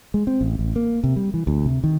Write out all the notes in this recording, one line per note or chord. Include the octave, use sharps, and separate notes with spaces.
G#3
C4
A1
A1
A#3
C3
G3
E3
D2
C3
D#3